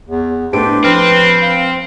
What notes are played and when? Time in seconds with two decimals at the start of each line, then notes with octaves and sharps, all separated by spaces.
0.08 E2
0.53 A2 D4 G4 B4 C5 D7
0.84 F3 C4 B4 C6 F6
1.42 F5